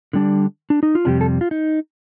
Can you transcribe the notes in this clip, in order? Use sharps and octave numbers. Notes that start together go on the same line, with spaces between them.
D3 G3 D4
D4
D#4
F4
F2 C3 G3 D4 G4
A4
F4
D#4